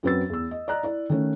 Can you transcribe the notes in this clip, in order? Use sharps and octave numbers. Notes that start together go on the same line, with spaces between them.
F#2 F#3 C4 B4 E6 A6
E2 E6
D#5
D5 D#5 A#5 F#6
E4 D5
D#3 A3 C#4